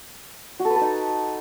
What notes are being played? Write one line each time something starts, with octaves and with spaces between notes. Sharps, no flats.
F#4
A4
B4
A4
D#4